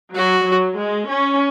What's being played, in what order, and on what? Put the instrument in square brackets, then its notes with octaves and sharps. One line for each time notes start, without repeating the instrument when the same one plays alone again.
[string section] F#3 [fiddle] F#4
[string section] F#3
G#3
C#4